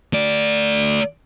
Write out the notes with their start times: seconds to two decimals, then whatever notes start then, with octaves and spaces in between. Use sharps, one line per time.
0.13 A3 D5